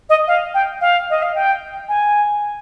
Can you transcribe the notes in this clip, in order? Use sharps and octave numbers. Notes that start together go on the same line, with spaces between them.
D#5
F5
G5
F5
D#5
F5
G5
G#5